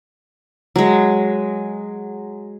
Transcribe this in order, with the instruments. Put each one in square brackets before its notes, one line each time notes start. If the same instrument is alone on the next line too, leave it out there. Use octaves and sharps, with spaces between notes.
[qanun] F#3 G#3